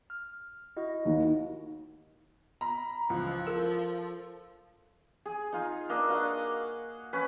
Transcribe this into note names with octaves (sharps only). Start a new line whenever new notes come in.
F6
E4 F#4 D#5
D#2
A#5 B5
C#2 E3 F3
A4 A#4
G#4
D#4 F4
A#3 D4 D#5
F#4 D#5 F5 F#5
C#4 B4